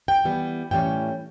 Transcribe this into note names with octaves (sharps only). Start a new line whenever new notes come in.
G5
E3 G3 B3
A2 E3 G3 C#4 G5